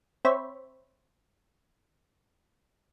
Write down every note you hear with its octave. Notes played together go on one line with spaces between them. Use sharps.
C4 C5 C#5 E5 B5